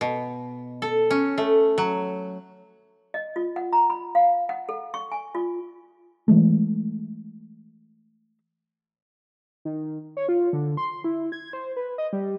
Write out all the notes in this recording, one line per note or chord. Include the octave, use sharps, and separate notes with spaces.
B2
A4
C#4
A3
F#3
D#5
F4
F#5
A#5
B5
F5
F#5
A4
C#6
G#5
F4
E3 G#3 A3
D#3
C#5
F4
D3
C6
E4
G#6
C5
B4
D#5
G3